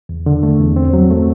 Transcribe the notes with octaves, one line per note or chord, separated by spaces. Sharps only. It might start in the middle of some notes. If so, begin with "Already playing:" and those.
E2
D3
A3
E2
C4
F#3
A3